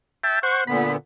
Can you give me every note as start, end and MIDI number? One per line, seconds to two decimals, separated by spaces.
0.24 0.39 76
0.24 0.39 79
0.24 0.39 81
0.43 0.64 72
0.43 0.64 78
0.43 0.61 85
0.67 0.96 46
0.67 0.96 50
0.67 0.96 59
0.67 0.92 83